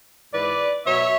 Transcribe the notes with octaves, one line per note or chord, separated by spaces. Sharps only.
G#2 E3 B4 D5
B2 F#3 C#5 E5